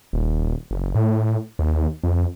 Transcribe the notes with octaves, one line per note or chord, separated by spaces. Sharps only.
D#1
F#1
A2
D#2
F2